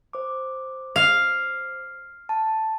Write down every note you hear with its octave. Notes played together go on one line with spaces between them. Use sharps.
C5 D6
F5
A5